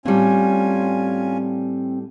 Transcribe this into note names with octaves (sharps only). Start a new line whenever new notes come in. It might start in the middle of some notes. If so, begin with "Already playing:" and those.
A2 G3 C4 C#4 F4 G#5